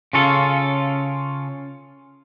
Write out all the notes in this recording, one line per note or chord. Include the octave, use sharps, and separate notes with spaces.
C#3 C#4 F4 A4